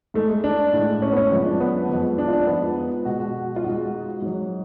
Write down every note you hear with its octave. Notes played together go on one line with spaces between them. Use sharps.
G#2 G#3 A3
G#3
D4
A2 G#3
C#4
B3
C#4
F#2 F3 G#3
D4
B3
F2 F3 G#3
D4
F4
D4
G#2 F3 G#3 B3
B2 G#3 F#4
F#4
F4
G#2 G#3 F#4
G#2 F#3